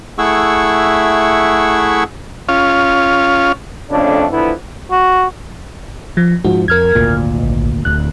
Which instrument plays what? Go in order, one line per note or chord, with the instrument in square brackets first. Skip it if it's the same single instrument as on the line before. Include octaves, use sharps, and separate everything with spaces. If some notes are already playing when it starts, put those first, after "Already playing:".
[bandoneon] A3 E4 G#4 F#5 C#6 E6
[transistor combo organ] C#4 F4
[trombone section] F2 C#3 A3 D4
D3 E3 F3 B3 E4
[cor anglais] F#4
[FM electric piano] F3
[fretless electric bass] G#2 F3 [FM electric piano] F#4
[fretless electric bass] F2 [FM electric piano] A#4 F6 G#6
[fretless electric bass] G#1 D2 A#2
[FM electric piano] A#1
[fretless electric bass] D1 D2 [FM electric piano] F#6